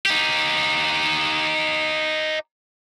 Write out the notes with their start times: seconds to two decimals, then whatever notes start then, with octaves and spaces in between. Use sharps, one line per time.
0.06 D#4 G4